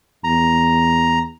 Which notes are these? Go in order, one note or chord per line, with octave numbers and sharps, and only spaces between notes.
E2 A#5